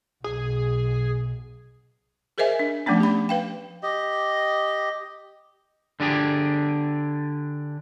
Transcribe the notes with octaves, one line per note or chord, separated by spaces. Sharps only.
B1 G#4
G#4 A#4 C5 D#5 E5 G#5
D4
F3 A3 B3 C#4 D4
G4 B5
B4 F5 G5
G4 D#5
D3 D4 G4 G#4